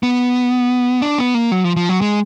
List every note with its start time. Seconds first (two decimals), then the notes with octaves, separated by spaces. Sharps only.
0.03 B3
1.02 D4
1.18 B3
1.34 A#3
1.52 F#3
1.64 F3
1.76 F3
1.89 F#3
2.01 G#3